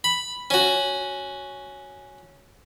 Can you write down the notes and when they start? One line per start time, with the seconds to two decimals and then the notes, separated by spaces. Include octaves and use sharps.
0.04 B5
0.50 C#4 F#4